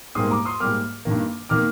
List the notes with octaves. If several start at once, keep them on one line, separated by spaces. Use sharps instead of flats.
G#2 G3 A#3 C6 D#6
A#5 D6
C6 D#6
G#2 G3 A#3 D6 F6
G2 D#3 A#3
D#3 A#3 D6 F6